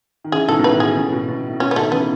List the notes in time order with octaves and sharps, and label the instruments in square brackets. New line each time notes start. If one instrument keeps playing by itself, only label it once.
[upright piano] D#3
[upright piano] C#3 E3 [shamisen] G#4
[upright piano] B2 D#3 [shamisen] A4
[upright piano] B2
[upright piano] A2 C#3 [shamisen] B4
[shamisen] G#4
[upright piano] A2 C#3
B2
B2
A2
[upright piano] B2 [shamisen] C#4
[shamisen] B3
[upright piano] B2 D#3 [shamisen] A3
[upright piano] C#3 E3 [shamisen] B3